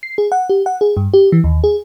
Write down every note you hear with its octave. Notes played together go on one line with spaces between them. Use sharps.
C7
G#4
F#5
G4
F#5
G#4
G2
G4
E3
D#2
G#4